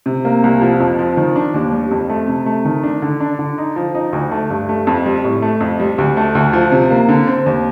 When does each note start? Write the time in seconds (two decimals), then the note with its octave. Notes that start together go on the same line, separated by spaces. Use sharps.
0.06 C3
0.25 A#3
0.44 C2
0.61 F3
0.80 F2
0.99 F3
1.17 D#3
1.36 D4
1.54 D#2
1.72 G3
1.91 F2
2.10 A3
2.28 C3
2.46 A3
2.65 D#3
2.83 D4
3.02 D3
3.21 D4
3.39 D3
3.58 D#4
3.76 F3
3.95 D#4
4.13 D2
4.31 A3
4.50 G2
4.69 A3
4.87 F2
5.06 G3
5.24 A2
5.42 A3
5.61 F2
5.80 G3
5.98 D2
6.17 A3
6.35 D2
6.53 F3
6.72 C3
6.90 A#3
7.09 D3
7.27 C4
7.46 D#2